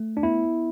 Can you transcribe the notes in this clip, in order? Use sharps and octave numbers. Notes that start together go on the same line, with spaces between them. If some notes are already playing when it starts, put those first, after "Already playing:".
Already playing: A3
D4
B3 E4